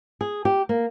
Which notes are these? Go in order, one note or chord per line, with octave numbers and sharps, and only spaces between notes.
G#4
G4
A#3